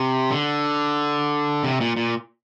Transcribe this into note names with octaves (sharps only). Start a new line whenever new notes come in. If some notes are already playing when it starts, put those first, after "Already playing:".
Already playing: C3
D3
C3
A#2
A#2